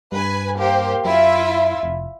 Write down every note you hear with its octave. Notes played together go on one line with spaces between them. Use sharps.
G2 B4 G#5
A#3 G4 C5
F#2 E4 F4 E5
F1